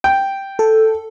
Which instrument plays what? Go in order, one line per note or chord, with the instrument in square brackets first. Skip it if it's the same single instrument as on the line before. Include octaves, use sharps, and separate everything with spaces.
[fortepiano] G5
[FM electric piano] A4